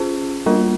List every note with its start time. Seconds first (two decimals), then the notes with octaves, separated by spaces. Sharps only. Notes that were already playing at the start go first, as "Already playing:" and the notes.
Already playing: C#4 F4 G#4 C5
0.46 G3 A#3 D4 F4 A#4